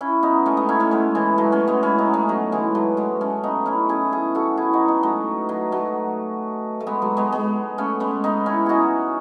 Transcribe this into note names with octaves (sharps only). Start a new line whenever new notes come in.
C#4 E4
B3 D#4
A3 C#4
B3 D#4
C#4 E4
A3 C#4
G#3 B3
E3 G#3
F#3 A3
A3 C#4
G#3 B3
C#4 E4
B3 D#4
A3 C#4
F#3
E3 G#3
F#3 A3
G#3 B3
A3 C#4
B3 D#4
C#4 E4
E4 G#4
E4 G#4
F#4 A4
E4 G#4
D#4 F#4
B3 D#4
F#3 A3
F#3
F#3 A3
A3
G#3 B3
F#3 A3
G#3 B3
G#3 B3
A3 C#4
G#3 B3
B3 D#4
C#4 E4
D#4 F#4 G#4